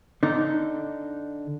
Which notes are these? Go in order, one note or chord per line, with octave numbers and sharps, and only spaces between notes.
D3 D#4